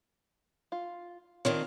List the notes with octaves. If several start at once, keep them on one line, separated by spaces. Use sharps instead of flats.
F4
D#3 C4 D4 F4 A#4 C#5